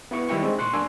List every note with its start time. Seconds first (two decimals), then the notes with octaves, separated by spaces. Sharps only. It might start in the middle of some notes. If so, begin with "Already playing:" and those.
0.11 B3 E4 E5 C#6
0.29 F2 D#3 G3 E4 G5 C#6
0.43 G#2 G#3 C4 D4 D#4
0.59 A#2 C6 C#6 F#6
0.73 F#2 A#3 D4 G#5 C6 E6